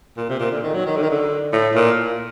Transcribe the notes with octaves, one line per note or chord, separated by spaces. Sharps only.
A#2
C3
A#2
D3
D#3
F#3
D#3
D3
D#3
D3
A2
A#2